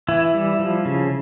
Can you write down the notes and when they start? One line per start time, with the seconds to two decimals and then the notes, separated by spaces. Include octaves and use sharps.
0.08 E3 E4
0.34 G3
0.59 F3
0.85 C#3